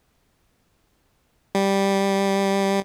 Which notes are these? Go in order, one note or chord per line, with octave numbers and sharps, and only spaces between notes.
G3